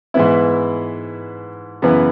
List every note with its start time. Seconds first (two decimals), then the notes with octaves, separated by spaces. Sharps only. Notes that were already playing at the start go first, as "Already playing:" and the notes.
0.14 G#2 E3 B3 E4
1.82 F#2 C#3 E3 B3